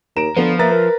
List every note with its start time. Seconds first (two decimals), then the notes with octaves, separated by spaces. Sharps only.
0.17 D#2 A#5 D7 E7
0.37 D3 F3 B3
0.59 A#3 B4 E5 A#5 A6
0.72 A#4